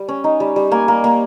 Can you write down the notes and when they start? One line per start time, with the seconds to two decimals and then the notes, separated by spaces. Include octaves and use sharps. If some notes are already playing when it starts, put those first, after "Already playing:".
Already playing: G3
0.08 C#4
0.24 D#4
0.40 G3
0.56 G3
0.72 A#3 G#5
0.88 A#3
1.04 A#3